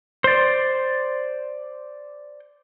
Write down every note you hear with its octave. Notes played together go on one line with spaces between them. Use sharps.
C5 D5